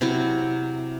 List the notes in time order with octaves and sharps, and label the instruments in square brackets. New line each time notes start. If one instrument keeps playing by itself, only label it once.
[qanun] C3 F#3 E4